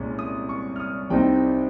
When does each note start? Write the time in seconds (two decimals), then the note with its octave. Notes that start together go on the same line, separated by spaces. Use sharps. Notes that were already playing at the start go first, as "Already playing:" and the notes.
Already playing: C2 A#2 G#3 C#4
0.19 D#6
0.49 C#6
0.76 F6
0.80 D#6
1.10 C2 C3 G3 C4 D#4 G5